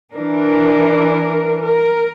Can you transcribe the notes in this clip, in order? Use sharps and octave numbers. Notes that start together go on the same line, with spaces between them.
E3 D4 A#4
A#4